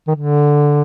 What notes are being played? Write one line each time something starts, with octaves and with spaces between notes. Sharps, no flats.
D#3
D3